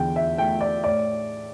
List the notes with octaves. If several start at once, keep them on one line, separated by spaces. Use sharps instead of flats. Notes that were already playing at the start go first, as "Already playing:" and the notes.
Already playing: E2 D3 G5
E5
A3 G5
D5
A2 D5